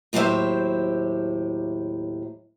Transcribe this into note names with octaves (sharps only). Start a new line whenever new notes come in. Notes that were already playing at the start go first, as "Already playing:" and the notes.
D#2 A2 F#3 G4 C5 E5